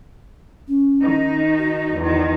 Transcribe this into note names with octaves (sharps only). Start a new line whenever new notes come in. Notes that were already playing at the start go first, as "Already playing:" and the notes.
C#4
D#3 D#4
F#4
E2 D#3